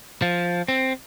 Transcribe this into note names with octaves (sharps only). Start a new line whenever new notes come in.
F3
C4